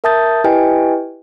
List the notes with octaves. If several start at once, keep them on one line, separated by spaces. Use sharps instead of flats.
A#4 E5 A5 D#6 G6 A6
E4 G4 B4 D#5 G5 G#5